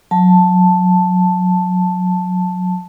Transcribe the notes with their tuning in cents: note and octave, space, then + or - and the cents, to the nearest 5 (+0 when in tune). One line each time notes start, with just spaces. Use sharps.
F#3 -20 A5 +0